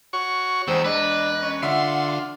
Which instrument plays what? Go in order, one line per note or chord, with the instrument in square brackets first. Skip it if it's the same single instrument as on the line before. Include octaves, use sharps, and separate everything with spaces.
[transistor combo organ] F#4 C#5 C#6
[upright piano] E1 [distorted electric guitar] E2 [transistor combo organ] G#3 G5 E6 [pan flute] C5
[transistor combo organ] D4 [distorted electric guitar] B4 [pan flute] D#5
[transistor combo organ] C#4
[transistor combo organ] D3 F4 [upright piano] E5 [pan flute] F#5 [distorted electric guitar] C6